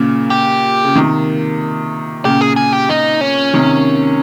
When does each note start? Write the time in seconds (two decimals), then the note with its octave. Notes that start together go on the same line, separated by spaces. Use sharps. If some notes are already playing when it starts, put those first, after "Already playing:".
Already playing: A#2 C#3
0.30 G4
0.84 C#3
0.95 C3 D#3
2.25 A#2 C#3 G4
2.41 G#4
2.56 G#4
2.73 G4
2.89 D#4
3.21 C#4
3.54 C3 D#3